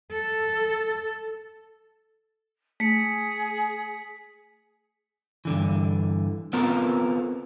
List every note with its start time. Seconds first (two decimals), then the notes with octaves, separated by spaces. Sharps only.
0.11 A4
2.80 A3 G#4 B6 C#7
5.45 G2 D3 E3
6.53 B3 C4 F4 A4 A#4